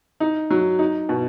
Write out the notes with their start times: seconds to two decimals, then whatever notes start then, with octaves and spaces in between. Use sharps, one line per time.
0.20 D#4
0.50 F#3
0.79 D#4
1.09 B2